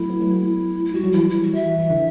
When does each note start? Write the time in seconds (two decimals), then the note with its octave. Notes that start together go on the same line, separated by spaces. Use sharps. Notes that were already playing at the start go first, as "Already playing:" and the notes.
Already playing: F#3 A3 E4
0.10 B3
0.20 F#3 A3
0.85 E4
0.94 G3 F#4
1.04 F#3
1.12 E3 G3 E4
1.30 E4
1.43 F#4
1.55 E5
1.66 E3
1.79 E3
1.90 D3